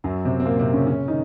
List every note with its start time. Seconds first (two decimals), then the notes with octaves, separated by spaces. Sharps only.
0.04 F#2 F#3
0.25 C3 C4
0.40 C4
0.45 A#2 A#3
0.59 C3 C4
0.73 C#3 C#4
0.87 C#3 C#4
1.08 D#3 D#4